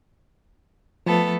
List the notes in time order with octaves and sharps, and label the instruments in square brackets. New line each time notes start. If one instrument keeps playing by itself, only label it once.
[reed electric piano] F3 [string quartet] A3 B3 A4